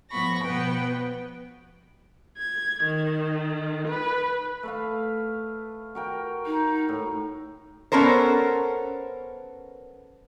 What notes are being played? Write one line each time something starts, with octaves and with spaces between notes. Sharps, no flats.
A2 F3 B3 B5 C#6 A#6
B2 F3 B3 B4 G5
G#6
D#3
B4
A3 B4 F5
F#4 A#4 G5
D#4
A2
B3 C#4 A4 A#4 C5